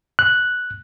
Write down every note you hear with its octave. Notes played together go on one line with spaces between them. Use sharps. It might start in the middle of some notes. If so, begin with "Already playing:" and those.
F#6